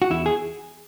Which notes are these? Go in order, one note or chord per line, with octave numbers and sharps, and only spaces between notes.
F#4
E2 E4
G#4